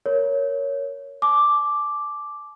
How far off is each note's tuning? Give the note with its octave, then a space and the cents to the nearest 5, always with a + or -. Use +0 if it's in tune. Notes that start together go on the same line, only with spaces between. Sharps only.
A#4 +0 C#5 +5
A5 -45 D6 +0